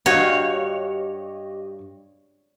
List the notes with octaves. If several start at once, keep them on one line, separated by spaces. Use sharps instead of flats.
G2 F#4 G4 C#5 D#5 F5